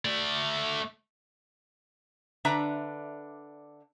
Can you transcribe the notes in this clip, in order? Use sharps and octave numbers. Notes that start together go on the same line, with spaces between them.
A3 D5
D3 D4 B4 E5 A#5